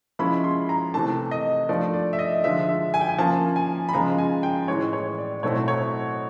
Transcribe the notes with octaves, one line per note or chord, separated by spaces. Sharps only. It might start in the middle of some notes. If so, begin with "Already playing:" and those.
F3 G#3 C#4 E4 B5
C6
A#5
C3 E3 A3 A5
D#5
F3 A3 D4 D5
D5
E5
D#5
D3 F3 G#3 E5
E5
G#5
G5
G#5
F3 A#3 C#4 A5
G#5
B5
C#3 F3 G#3 A#5
G#5
G5
A2 E3 G#3 C#5
C#5
D5
B2 F#3 A3 C4 E4 C#5
C#5